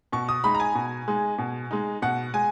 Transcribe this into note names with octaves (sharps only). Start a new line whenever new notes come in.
B2 C#6
D#6
G#3 D#4 B5
A#5
G#5
B2
G#3 D#4
B2
G#3 D#4
B2 F#5
G#3 G#5